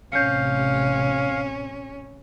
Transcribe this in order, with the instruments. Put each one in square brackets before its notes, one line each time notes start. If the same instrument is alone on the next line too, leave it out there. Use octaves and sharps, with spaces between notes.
[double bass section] A1 C3 [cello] C#4 [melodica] F5 [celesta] G6 C7 C#7